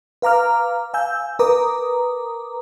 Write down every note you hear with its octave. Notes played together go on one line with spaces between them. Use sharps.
B4 F5 A#5 D6 F6
F5 G#5 E6 G6
A#4 B4 A#5 D6 D#6